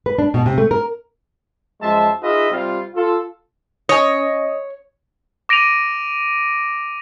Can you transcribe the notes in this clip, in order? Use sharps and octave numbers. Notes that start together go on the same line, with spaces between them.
B4
D4
B2
C3
A3
A#4
F#2 F3 G#3 E5 A5 C6
D#4 F4 G#4 B4 D#5 E5
C3 G3 F4
F4 A4
C#4 C#5 D#5
D6 A#6 D7 D#7 F7